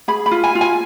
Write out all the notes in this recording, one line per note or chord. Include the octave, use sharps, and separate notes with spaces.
G#4 B5
B5
F4
G#5
F4
G#5